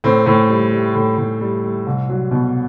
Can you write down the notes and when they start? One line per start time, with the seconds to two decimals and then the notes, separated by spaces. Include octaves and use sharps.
0.04 A2 C4
0.26 A2
0.49 G3
0.71 G3
0.95 A2
1.17 A2
1.41 G3
1.64 G3
1.86 C2
2.09 F#3
2.31 B2